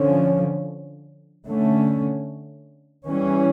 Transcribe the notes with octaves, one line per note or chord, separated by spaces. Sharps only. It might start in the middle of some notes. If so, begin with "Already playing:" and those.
Already playing: D3 F3 C#4
D3 A3 C#4
E3 G3 C#4